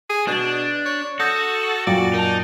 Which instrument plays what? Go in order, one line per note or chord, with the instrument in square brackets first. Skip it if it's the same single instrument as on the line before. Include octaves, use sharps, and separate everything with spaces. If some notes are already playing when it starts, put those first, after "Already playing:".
[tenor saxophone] G#4
[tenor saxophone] B2 [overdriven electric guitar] D4
[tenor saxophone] C#5
[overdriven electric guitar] F#4 [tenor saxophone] A4 [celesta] D#6 G6 A#6
[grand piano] F#2 A#2 F#3 [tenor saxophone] D5 [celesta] F5 G5
[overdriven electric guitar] D#4 [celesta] A#4 A5